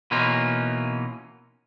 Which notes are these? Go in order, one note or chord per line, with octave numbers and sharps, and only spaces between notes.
B2 E3 A#3 C#4 D#4 F4